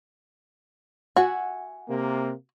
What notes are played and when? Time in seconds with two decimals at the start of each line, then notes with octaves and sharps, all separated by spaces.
1.16 F#4 E5 F#5 G#5
1.89 C3 A#3